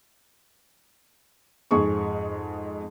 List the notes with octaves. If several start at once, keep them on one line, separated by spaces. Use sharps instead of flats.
F2 G#2 G#4 C#6